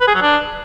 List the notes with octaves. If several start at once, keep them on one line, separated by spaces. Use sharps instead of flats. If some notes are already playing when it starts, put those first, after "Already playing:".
B4
G#4
F#3
D4